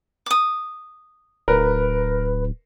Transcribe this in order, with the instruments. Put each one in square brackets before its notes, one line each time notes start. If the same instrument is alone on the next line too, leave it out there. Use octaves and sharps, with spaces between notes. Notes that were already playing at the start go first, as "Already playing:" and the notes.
[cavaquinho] D6 D#6
[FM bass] D1 [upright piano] A#4 [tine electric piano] B4